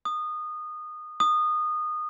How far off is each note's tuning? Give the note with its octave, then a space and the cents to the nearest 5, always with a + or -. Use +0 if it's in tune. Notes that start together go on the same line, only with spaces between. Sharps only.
D#6 -20
D#6 -20